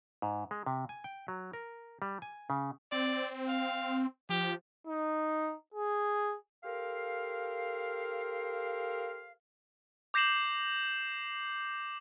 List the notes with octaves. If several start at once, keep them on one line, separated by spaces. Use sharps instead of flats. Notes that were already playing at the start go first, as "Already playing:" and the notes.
G#2
G#3
C3
G#5
G5
F#3
A#4
G3
G#5
C#3
C4 D5
F5
F3 G4
D#4
G#4
G4 A4 A#4 C5 F5
D6 G6 A#6 C7 E7 F#7